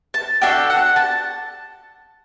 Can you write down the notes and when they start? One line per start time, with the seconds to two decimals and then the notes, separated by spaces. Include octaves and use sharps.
0.14 A5
0.41 D4 F#4 A4 G5
0.70 F#5
0.96 A5